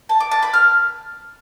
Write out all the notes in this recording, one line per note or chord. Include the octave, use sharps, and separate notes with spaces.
A5
D6
A5
B5
F6